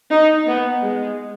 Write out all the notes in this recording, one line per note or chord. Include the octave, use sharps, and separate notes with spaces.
D#4
B3
G#3